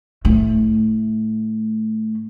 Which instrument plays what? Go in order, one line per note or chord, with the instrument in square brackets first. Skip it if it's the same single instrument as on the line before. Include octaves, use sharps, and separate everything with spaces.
[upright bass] A2 A3